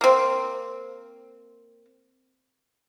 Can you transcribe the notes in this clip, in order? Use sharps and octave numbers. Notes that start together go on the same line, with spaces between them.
A#3 C4